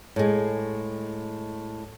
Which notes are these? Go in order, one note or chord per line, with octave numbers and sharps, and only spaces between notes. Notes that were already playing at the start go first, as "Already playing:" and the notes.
A2 G#3